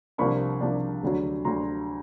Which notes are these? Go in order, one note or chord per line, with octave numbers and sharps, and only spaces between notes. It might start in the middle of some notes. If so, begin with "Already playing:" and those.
C2 C3 F3 A#3 D4 B5 C#6
C2 C3 F3 A#3 D4
D2 D3 F#3
D2 D3 F#3 A#5 C6